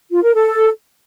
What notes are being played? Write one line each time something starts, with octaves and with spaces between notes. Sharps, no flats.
F4
A#4
A4